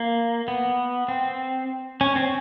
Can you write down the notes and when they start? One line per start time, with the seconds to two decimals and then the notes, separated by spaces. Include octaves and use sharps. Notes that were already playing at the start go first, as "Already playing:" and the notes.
Already playing: A#3
0.48 B3
1.08 C4
2.01 C#4
2.16 C4